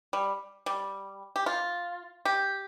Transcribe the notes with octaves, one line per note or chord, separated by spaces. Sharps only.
G3
G3
G4
F4
G4